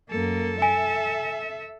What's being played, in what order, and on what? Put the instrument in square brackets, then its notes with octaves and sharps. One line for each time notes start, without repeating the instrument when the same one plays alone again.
[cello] F#2 A#3 [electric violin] A4
[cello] E5 [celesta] G#5